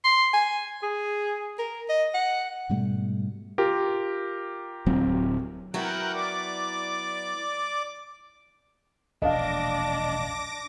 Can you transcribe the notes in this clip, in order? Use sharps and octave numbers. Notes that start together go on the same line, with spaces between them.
C6
G#5
G#4
A#4
D#5
F#5
G#2 B2 G3 A3
F4 G4 A#4
D1 F#3 C4
F#3 B3 E4 A#4 F#5 G5
D5 D6
E1 A#1 D4 D#5 F5 D6 A#6